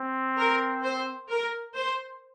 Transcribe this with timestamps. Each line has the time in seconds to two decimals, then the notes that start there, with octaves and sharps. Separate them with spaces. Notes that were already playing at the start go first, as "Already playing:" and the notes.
Already playing: C4
0.38 A#4
0.83 C5
1.29 A#4
1.75 C5